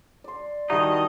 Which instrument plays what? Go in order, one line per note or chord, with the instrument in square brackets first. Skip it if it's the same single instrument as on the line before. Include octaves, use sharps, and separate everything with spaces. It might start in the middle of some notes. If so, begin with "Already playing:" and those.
[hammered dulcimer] D5 C6
[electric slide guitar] D#3 D#4 [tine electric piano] G3 E4 F#4 [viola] D#5 [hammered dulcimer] G5 A5